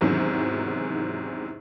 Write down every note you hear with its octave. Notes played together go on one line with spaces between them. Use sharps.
E2 G#2 C3 D#3 F#3 C#4